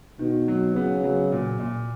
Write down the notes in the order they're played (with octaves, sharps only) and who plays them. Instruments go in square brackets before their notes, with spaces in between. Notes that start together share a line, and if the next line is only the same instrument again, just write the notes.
[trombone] B2 [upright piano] D#3
[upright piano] F#3
[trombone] C#3 [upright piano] B3
[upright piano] F#3
A#2
A#2